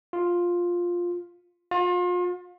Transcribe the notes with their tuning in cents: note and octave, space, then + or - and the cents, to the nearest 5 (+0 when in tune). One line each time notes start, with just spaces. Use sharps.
F4 +5
F4 +35